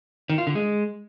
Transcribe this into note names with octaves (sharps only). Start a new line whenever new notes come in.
D#3
F4
D3
G#3